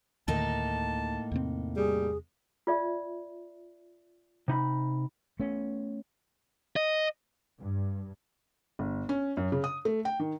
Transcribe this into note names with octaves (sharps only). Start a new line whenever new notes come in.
D2 A2 D3 D#3 A#3 D#4 A5
E2 C3 C4
G3 G#4
F4 D5 E5
C3 D#4 B5
A3 B3 C#4
D#5
G2
G1
C#4
F#2
C#3
D#6
A3
G5
D#3